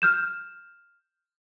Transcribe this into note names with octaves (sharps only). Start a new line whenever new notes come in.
F6 G6 E7